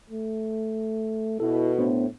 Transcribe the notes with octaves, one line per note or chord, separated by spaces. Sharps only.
A3
B2 E4 A4
A2 B3 D4 C5